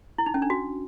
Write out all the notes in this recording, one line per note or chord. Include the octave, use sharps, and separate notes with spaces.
E4
D#4
C#4
D4
F#4